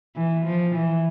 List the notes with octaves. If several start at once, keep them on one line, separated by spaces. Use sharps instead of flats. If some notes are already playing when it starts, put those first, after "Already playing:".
E3
F3
E3